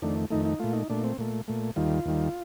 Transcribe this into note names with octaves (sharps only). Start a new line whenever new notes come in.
F2 D#3 A3 D4
F2 D#3 A3 D#4
D#4
A#2 A3 F4
D#4
A#2 A3 D4
C4
A#2 A3
A#2 A3
D#2 D#3 G3 F4
D#2 D#3 G3